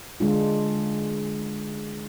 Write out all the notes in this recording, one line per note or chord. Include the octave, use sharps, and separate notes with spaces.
D3 G#3 D4 F4